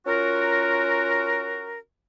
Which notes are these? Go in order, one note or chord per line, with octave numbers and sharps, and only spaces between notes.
C#4 F4 F#4 A#4